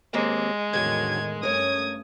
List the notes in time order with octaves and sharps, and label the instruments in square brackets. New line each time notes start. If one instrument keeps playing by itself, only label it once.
[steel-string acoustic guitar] D#2 A#3 C4 [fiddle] G#3
[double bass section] E2 A2 D#3 [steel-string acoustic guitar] D3 F#3 [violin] G#6
[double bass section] G2 A3 C#4 [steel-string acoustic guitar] A#4 C#5 [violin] D#6 G#6